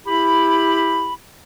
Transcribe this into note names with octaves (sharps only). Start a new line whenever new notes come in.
E4 G4 B5